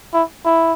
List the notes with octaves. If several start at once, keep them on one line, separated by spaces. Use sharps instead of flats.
E4
E4